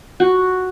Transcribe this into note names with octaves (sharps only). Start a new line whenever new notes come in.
F#4